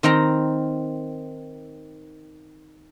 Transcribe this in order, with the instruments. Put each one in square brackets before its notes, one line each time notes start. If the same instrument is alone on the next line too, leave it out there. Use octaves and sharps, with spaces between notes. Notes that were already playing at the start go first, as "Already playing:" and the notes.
[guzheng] D#3 C4 G5 A#5